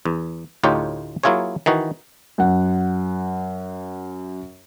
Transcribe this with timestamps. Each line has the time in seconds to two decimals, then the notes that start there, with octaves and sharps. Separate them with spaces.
0.05 E2
0.63 D2 A2 D#4 F4 G4 C#5
1.23 F#3 A#3 E4 F4 G#4 C#5
1.66 D#3 E3 D#4 F#4
2.38 F#2 F#5